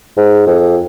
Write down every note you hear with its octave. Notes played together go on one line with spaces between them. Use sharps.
G#2
F2